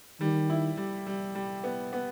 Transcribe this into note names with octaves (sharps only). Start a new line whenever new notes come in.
D#3 G3
E4
G3
G3
G3
B3
B3